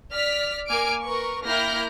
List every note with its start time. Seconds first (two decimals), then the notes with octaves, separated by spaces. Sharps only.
0.11 D5 F6 B6
0.67 A#3 G#5 D6 F6 D7
1.02 A#4 B4 C#6
1.45 A#3 E4 G5 F6 G6 A#6